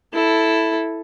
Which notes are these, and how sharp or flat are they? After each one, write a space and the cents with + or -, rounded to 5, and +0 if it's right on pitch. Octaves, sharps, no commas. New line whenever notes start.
E4 +0 A4 +0